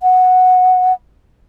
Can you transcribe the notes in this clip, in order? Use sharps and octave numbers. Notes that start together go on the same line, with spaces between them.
F#5